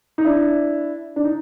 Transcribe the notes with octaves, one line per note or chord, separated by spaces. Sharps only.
D#4
D4 E4
D4
D#4